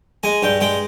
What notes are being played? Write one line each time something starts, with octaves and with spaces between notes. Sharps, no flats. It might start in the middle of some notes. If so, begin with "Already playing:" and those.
G#3 G#5
G2 G5
G#3 G5